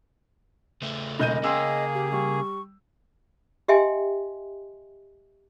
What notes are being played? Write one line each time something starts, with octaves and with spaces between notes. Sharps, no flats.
C#3 A3
E1 D#5 G6 D#7
C#3 A#3 G#4 G5 C6 E6
G4
G3 C#6
G4 D#5 E5 G5 G#5 C6